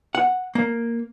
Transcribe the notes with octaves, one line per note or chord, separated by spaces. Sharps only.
F#5
A#3